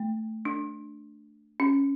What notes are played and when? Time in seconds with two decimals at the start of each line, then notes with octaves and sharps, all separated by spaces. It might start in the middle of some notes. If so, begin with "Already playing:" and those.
Already playing: A3
0.45 D4
1.60 C#4